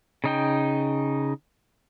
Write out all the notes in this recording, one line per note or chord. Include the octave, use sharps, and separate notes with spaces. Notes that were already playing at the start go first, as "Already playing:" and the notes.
C#3 D#4 G5